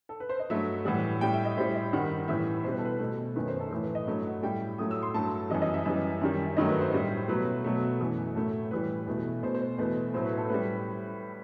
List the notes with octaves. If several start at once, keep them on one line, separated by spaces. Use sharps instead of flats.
A4
B4
C5
D#5
G2 F#3 A3 E5
A2 E3 G3 F#5
A2 G3 G5
E5
D#5
A2 G3 C5
D#5
G2 D#3 G3 F#5
A2 E3 G3 E5
B2 G3 B4 C5
A4
B4
B2 A3 A4
F#2 D#3 A3 B4
C5
A4
A2 E3 A3
B4
D#5
G2 F#3 A3 E5
F#5
A2 G3 G5
A2 F#3 A3 D#6
E6
C6
G2 F#3 A3 A5
F#2 E3 G3 D#5
D#5
E5
F#2 E3 G3
F#2 D#3 G3
G2 D#3 F#3 A3 D#5
B4
C5
A2 G3
B2 F#3 A3 B4
B2 F#3 A3
F#2 E3 A3
A2 F#3 A3 A4
A2 E3 G3 B4
E2 B2 A3
B2 A3 C5
C5
E2 B2 A3 B4
A2 F#3 A3 C5
B4
A4
A2 G3 B4